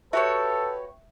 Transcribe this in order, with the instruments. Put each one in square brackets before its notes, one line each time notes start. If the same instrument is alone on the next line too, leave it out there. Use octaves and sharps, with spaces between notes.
[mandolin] F#4 G4 C#5 [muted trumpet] A4 [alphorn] B4 [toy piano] E5